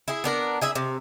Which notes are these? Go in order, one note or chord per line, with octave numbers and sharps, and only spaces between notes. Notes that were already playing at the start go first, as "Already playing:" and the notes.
E4 G#4
B3 D4 A#4
E4 G#4 E5
C3